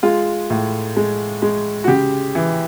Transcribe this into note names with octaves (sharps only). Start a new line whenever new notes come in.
G#3 F4
A2
G#3
G#3
F#4
C#3 G4
E3